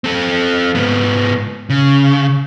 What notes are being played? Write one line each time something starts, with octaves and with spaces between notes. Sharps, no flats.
C4 A4
G#2 B3
C#3